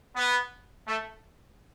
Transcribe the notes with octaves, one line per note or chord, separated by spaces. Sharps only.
B3
A3